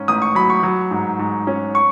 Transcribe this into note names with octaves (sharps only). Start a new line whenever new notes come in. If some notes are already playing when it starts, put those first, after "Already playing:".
Already playing: G#2 C#4
A1 D#6
C#6
F#3 B5
C#6
F#3
G#2
G#2
C#4
C#6